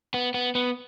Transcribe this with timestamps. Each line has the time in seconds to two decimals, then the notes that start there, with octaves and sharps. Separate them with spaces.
0.14 B3
0.34 B3
0.55 B3